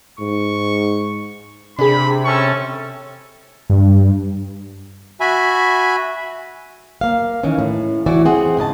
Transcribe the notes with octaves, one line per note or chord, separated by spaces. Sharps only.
G#2 C#6
C3 D4 G#4 B5
C4 C#4 A4 C#6
G2
F#4 E5 G#5 B5
A#3 F5
D#3 E3 C#4
A2
E3 E4 F#4 D5
C4 G#4 C5 F#5
G#2 C#3 D#5 A5